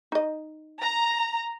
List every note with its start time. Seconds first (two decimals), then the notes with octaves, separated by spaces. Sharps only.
0.12 D#4 D#5
0.80 A#5